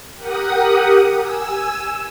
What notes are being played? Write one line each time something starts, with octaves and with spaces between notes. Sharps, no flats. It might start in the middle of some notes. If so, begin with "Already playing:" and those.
G4 A#4 F#5 D#6
G#5 E6